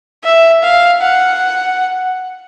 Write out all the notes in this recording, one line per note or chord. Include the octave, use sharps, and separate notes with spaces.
E5
F5
F#5